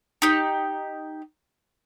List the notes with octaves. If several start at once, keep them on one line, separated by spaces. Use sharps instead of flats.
D#4 G4